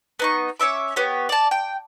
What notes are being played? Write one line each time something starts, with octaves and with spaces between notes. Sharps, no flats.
B3 D#4 C#6
C#4 C#5 E5 D6
B3 G4 C#5
D5 A5
G5